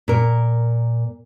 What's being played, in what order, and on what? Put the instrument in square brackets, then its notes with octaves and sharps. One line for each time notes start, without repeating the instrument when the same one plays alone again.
[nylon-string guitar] A#2 A#4